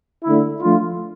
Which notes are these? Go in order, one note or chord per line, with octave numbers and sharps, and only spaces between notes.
D3 A3 E4
F3 A3 D4 F4